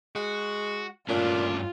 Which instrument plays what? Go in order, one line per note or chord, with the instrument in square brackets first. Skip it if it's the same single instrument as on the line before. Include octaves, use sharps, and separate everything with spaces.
[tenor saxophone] G#3 [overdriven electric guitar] F#4
[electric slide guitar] G2 A3 C#4 [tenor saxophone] A#2 [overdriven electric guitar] D4 [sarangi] F4